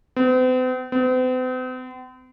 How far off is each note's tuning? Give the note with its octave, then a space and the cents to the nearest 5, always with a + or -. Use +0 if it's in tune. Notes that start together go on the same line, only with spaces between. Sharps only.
C4 -45
C4 -45